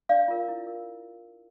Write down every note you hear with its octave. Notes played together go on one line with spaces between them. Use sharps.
D4 D5 F5
F4 A#4
E4
A#4